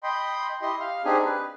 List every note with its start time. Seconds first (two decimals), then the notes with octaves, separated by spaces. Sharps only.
0.03 D#5 G5 B5 C6
0.62 E4 G4 D#5 C6
0.80 F5 F6
1.05 C4 D4 D#4 G4 G#4 G#5
1.25 B4